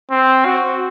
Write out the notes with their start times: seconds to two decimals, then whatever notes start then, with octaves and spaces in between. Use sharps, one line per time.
0.11 C4
0.45 F#4